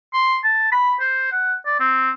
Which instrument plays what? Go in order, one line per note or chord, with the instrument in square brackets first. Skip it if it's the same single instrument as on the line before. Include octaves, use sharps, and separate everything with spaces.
[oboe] C6
A5
B5
C5
F#5
D5
C4